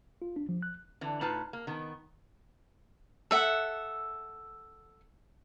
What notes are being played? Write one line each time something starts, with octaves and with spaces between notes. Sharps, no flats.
F4
D4
F3
F#6
D3 E3
A2 D#4 F4 B4 A5
A#3
D#3 B3
A4 E5 F#5